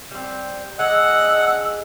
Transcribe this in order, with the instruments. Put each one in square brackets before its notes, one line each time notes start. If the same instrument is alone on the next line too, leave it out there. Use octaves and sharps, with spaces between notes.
[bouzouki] G3 C4
[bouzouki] G#3 D4 G#4 [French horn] D#5 [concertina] F#5 [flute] E6